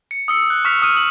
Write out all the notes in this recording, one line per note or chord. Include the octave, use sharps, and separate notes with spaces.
C#7
D#6 E6 C#7
F#6
C#6 F6 B6 F7
D#6 F6 D#7 E7
D#6 F6 F#7